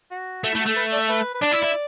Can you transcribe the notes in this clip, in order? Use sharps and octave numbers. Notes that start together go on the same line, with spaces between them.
F#4
A3 F#4
E4
A3
F#4
A3 A4
B4
D5
E5
B4
B4
D4 D5
E4
E4